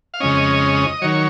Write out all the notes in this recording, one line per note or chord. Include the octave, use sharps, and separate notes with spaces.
F5
F2 C#3 G#3 C#4 D#5
D#3 F#3 C#5